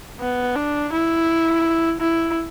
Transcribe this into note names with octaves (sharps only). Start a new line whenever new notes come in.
B3
D4
E4
E4